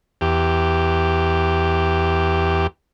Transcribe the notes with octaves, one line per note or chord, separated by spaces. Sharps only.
E2 G4